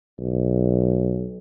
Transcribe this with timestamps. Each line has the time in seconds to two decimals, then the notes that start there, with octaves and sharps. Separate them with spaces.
0.19 B1